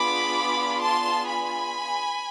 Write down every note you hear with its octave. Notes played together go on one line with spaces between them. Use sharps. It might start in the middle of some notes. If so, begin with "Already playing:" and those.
Already playing: B3 D4 F4 G#4 B5 D6
A5 C6
G#5 B5